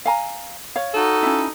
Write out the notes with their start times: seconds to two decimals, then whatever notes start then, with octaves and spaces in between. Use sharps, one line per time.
0.05 F5 G#5 A#5
0.76 C#5 F5
0.95 D#4 F#4 A4
1.23 C#4 E4